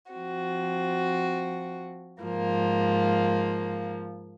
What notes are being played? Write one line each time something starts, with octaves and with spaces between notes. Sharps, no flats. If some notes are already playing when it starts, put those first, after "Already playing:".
F3 C4 F#4
G#2 F3 A#3